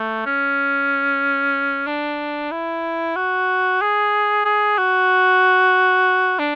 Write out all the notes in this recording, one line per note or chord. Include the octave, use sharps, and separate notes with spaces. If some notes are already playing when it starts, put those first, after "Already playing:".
Already playing: A3
C#4
D4
E4
F#4
G#4
G#4
F#4
D4